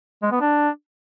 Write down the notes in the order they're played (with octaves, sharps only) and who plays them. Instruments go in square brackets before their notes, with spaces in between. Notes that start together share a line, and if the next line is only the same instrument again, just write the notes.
[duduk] G#3
B3
D4